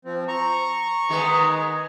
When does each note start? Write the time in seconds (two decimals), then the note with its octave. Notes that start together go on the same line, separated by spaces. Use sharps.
0.05 F3 C4
0.28 A#5 C#6
1.09 D#3 G#3 B3